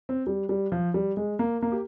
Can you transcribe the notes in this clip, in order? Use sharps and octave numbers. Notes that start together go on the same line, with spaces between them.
C4
G3
G3
F3
G3
G#3
A#3
A#3
G4